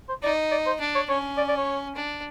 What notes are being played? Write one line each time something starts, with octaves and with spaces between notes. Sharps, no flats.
C5
D#4 D5
D5
C5
D4
C#5
C#4 C#5
D5
D5
C#5
D4